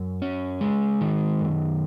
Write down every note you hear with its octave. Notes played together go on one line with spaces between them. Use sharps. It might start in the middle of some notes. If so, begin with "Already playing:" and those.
Already playing: F#2
C#4
G#3
D#3
F#2